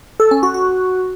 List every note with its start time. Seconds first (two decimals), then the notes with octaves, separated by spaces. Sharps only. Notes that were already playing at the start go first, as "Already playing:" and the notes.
0.20 A4
0.31 C#4
0.43 F#4
0.54 F#4